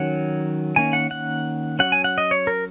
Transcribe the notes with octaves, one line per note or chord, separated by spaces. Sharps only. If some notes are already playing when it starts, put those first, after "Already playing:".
Already playing: D#3 F#3 C#4 F#5
D#3 A#3 C#4 G#5
F#5
F#5
F#3 C#4 F#5
G#5
F#5
D#5
C#5
A#4